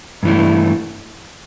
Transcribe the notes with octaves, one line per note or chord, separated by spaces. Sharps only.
G2 E3 A3